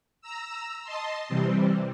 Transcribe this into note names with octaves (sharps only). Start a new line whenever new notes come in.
A#5 E6
D#5 A5 C6
C3 E3 G3 C4